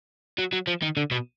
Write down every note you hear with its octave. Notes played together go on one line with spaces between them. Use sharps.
F#3
F#3
F3
D#3
D3
B2